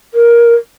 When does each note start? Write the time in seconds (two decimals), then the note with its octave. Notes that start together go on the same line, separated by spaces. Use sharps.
0.14 A#4